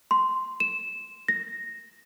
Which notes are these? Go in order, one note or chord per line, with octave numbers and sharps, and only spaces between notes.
C6
E7
A#6